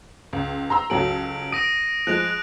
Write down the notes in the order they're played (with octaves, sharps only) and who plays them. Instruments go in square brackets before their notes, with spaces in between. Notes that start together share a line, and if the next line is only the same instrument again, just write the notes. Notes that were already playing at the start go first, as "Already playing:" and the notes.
[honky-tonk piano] C#2
A#5 C6 E6
[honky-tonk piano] C#2 F#3 A4 [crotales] D7 F#7
[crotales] D#6 A#6 D#7 [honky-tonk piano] D7
[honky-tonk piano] F3 G#3 [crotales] F#6 D7 F7